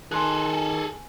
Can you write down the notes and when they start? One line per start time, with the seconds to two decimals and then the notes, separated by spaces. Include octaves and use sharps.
0.11 D#3 G#4 A4 G#5 C6 F#6
0.52 G#5